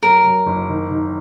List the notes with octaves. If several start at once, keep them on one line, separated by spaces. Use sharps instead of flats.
F#2 A#4
F#2
F#1
D#3
D#3